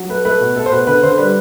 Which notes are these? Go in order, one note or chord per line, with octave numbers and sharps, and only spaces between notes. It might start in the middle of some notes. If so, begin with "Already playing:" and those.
Already playing: F#3
A3 B4
A3 B4
B2
A3 A4
C5
B2 B4
D3 B4
D3 C5
G3 B4